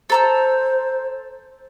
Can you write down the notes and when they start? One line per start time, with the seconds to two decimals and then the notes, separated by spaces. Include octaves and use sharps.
0.10 A4 C5 A#5 E6